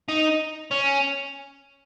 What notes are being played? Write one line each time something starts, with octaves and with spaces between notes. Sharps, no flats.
D#4
C#4